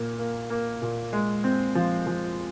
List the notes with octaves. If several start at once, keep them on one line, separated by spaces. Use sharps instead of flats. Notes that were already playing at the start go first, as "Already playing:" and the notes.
Already playing: A#2 A#3
A#3
A#3
A#2
G#3
C4
F3
F3